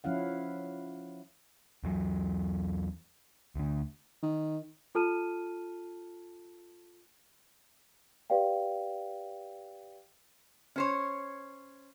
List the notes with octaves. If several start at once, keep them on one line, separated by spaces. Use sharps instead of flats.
F3 C#4 E4 F5 F#5
E2 E3 F#3
D2 D3
D#3
F4 A4 A5 F6 D#7
G4 B4 D5 F5 G5
C#4 C5 C#5